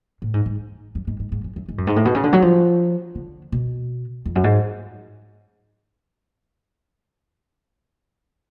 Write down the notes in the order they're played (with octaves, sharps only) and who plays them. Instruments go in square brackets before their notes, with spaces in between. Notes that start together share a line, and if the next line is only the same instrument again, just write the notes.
[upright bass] A2
G#2
G#2
F#2
G#2
G#2
G#2
F#2
F#2
G#2
F#2
G#2
A2
B2
C#3
D3
F#3
F3
D3
B2
F2
F#2
G#2